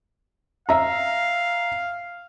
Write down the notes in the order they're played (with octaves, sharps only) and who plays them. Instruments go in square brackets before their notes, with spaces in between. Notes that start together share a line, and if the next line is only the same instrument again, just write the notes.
[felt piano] E5 A#5 [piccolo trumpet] F5